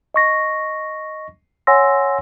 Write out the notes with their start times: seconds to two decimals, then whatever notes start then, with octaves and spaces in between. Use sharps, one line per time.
0.14 D#5 C#6 A#6
1.67 C#5 F#5 G#5 C6 E6 A#6